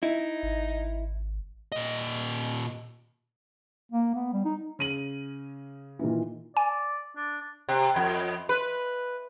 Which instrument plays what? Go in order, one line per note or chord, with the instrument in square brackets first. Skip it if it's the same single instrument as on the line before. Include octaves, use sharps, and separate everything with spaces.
[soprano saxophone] D#4 [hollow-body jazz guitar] E4
[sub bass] G#1
[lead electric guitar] A#2 D#5
[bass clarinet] A#3
B3
G3
D#4
[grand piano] C#3 D#7 F#7
[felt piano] A#2 D#3 E3
[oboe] D5 [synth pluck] G#5
[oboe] D4
[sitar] C3
F2
B4